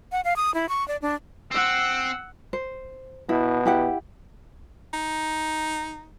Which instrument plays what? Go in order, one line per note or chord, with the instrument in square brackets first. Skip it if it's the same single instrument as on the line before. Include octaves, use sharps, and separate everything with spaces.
[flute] F#5
F5
D#6
E4
C#6
D5
D4
[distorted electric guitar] C4 [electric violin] F#5 E6
[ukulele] C5
[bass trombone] B2 [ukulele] E4
[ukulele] E4 G4 F#5
[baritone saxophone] D#4